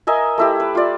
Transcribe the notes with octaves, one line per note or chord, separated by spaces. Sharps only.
A#4 D#5 E5 G#5
A3 E4 G4
B4
F4 D5